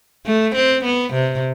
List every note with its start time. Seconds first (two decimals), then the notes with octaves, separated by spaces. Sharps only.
0.26 A3
0.55 C4
0.85 B3
1.14 C3